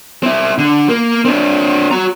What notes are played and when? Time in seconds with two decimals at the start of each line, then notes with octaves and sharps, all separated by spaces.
0.23 C4 E4
0.58 D3
0.89 A#3
1.25 C4 D4
1.91 F#4 A#5